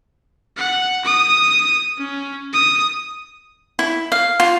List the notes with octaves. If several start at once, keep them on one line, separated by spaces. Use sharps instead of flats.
F#5
D#6
C#4
D#6
E4
F5
F4